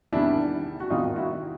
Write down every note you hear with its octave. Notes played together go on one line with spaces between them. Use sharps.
E2 C3 D#3 G3 D4 E4
F#4
E2 C3 D#3 G3 D#4 F4
E4 F#4